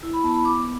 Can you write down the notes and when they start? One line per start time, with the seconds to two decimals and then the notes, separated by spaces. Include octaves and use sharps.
0.03 E4
0.13 B5
0.24 B3 A5
0.34 B5
0.45 B3 D6